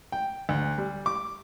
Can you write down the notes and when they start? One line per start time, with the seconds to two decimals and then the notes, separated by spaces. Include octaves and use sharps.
0.12 G5
0.49 D2
0.78 G3
1.06 D6